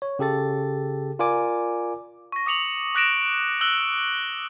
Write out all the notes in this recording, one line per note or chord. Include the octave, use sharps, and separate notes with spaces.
C#5
C#3 G4 A4 A6
F4 A#4 D5 G#5 D6
C#6 A#6
D6 D#6 C#7 F7 F#7
D6 F#6 A#6 D7 E7 F7
E6 F#6 F#7 G7